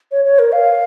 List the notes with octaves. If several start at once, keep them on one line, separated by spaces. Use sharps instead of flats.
C#5
C#5
A#4
F5